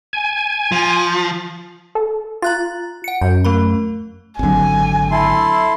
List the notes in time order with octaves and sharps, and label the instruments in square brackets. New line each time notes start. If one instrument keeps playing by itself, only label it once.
[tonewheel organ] G#5
[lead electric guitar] F3
[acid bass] A4
[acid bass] F4 [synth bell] A#5 F#6 A6
[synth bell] F#5 C#7
[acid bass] F#2 [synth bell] G6
[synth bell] A3 A#4 B5
[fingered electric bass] G#1 D3 [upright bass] F#3 C4 [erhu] G#5
[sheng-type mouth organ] E4 A4 C6